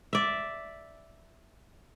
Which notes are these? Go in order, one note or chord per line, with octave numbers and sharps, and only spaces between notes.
D5 E5